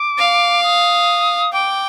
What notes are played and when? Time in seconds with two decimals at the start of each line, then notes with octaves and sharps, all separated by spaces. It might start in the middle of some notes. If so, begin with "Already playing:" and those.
Already playing: D6
0.18 F5
0.63 D#6
1.53 G5 D6